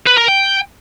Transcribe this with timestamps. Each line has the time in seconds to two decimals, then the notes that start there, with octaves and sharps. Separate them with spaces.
0.07 B4
0.18 A#4
0.29 G5